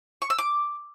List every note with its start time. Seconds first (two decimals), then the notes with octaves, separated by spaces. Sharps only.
0.22 C#6
0.30 E6
0.38 D6